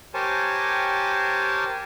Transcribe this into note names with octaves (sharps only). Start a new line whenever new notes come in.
G4 A#4 C5 C#5 G#5 A5